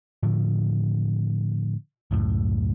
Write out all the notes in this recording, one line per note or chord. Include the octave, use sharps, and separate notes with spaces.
A2 D3 F3
C#2 F#2 A2